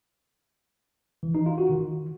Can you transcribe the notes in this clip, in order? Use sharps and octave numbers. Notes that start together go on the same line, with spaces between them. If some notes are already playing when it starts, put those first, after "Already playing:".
E3
D#4
F4
F#4
D#3